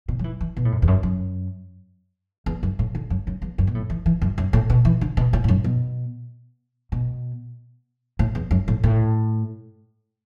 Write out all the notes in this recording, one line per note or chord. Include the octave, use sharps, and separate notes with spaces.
B2
F#3
E3
E3
B2
A2
F#2
E2
F#2
F#2
E2
F#2
A2
D3
F#2
F#2
E2
F#2
B2
A2
E3
E3
F#2
F#2
A2
B2
E3
D3
B2
A2
A2
F#2
B2
B2
A2
E2
F#2
A2
A2